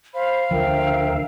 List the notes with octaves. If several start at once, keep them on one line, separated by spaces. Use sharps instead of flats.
C5 F5 B5
D2 D3 F3 A#4 C5 E5 G5